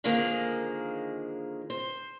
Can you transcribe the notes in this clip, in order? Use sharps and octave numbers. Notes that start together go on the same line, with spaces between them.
D3 D#3 F3 G#3 A#3 G#4
C5